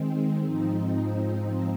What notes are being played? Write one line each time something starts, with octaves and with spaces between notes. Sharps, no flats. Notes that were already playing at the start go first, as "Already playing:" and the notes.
Already playing: D#3 G#3 C4
G#2 F3 C4 D#4